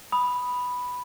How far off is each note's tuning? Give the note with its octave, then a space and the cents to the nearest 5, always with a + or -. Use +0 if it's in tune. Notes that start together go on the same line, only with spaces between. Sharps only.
B5 +0 D#6 +0